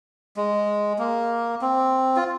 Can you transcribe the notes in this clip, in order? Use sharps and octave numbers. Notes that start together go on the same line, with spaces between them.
G#3
A#3
C4
F4